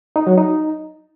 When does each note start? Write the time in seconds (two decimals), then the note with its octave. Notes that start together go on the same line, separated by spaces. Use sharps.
0.16 D#4
0.27 F#3
0.38 D#4